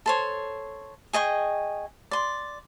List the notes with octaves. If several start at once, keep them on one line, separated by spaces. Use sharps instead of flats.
A4 C5 C#5
G#4 D#5 G5 C#6
D5 C6